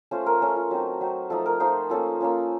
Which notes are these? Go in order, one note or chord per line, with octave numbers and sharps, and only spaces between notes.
A3 C#4 F4 C5
A#4
A3 C#4 F4
F4
F#3 C4 D#4 F#4
F#3 C4 D#4
F3 A3 D#4 A4
A#4
F3 A3 D#4 C5
A#3 C#4 F4 A4
A#3 C#4 F4